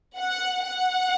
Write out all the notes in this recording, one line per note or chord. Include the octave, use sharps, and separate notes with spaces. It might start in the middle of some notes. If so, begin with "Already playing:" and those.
F#5
F#5